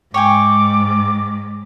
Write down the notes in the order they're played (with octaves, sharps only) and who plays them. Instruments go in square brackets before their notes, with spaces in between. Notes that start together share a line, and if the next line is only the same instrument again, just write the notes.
[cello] G#2 G#3 [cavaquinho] C#5 G5 G#5 [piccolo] D6